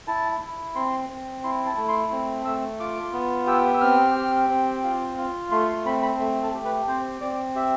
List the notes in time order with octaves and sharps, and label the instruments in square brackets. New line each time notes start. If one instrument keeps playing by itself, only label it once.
[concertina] E4 A5
E4
C4 C6
C4
E4 C6
A5
A3
C6
C4
A3 E6
F4 D6
B3
G4 E6
E6
C4 F6
G4
C4
F4
F4
A3 C6
C6
C4 B5
B5
A3
A4
G4
B4
C4 C5
C4 D5
G4 E5